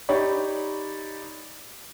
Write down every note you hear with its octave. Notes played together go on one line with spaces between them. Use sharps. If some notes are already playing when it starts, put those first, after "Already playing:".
D#4 G4 C#5 D5 B5